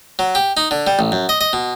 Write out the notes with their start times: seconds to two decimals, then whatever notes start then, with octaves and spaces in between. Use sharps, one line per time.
0.19 F#3
0.35 G4
0.57 D#4
0.71 D3
0.87 G3
0.99 A1
1.12 F#2
1.29 D#5
1.41 D#5
1.53 B2